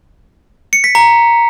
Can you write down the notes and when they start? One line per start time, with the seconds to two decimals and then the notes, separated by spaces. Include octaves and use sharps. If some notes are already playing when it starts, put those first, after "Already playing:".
0.73 C#7
0.84 B6
0.95 A#5